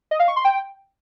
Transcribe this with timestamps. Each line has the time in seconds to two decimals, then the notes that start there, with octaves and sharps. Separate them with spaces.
0.11 D#5
0.19 F5
0.28 C#6
0.36 C6
0.45 G5